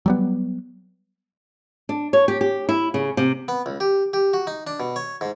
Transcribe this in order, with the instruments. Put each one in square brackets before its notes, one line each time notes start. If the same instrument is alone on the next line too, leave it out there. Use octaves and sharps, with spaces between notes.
[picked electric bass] F#3 G3 B3
[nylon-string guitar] D4
C#5
G4
G4
E4
C#3
C3
[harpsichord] B3
C#2
G4
G4
F#4
D#4
D4
B2
C#5
G#2